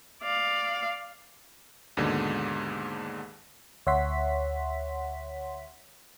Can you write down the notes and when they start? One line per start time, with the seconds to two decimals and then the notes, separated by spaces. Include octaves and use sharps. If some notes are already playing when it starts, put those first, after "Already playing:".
0.23 D5 F5
1.97 D#2 G#2 B2 D3 G#3
3.86 D2 C#5 E5 F#5 C6 B6